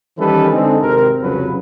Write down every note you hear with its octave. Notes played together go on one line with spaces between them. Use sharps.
D#3 E3 G3 C#4 A4 B4
D3 G#3 C4 D#4 G#4 A4
G#1 C3 C4 A#4
C2 F2 C#3 F#3 B4